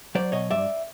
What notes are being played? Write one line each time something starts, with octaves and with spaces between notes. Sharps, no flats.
F#3 C5 D5
B2 C#5 D#5
G2 D5 E5